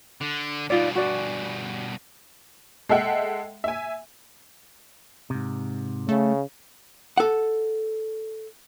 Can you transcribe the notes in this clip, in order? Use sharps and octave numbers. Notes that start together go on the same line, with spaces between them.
D3 D4
G2 B2 D#4 F4 D5
F#4 D5 G#5
G#3 A4 E5 F#5 G5
E5 G#5
G#2 C3
C#3 A3
A4 F#5